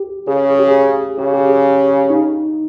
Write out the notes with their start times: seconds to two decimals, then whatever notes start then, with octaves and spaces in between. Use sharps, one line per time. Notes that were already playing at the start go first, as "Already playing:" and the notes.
Already playing: G4
0.27 C#3 G#4
0.50 G#4
0.59 G4
0.68 G#4
1.18 C#3 G4
1.34 G4
1.50 G#4
2.10 D#4